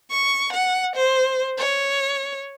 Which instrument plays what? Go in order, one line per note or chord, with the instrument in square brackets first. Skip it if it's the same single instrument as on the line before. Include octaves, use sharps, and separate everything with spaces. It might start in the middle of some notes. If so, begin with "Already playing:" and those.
[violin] C#6
F#5
C5
C#5